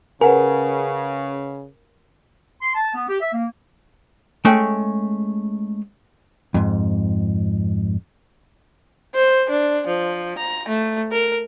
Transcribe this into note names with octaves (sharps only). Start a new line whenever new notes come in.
C#3 A#4 B4 F#5 G#5
C6
A5
B3
G4
E5
A#3
G#3 A3 C#4 G5
F2 G#2
C5
D4
F3
A#5
A3
A#4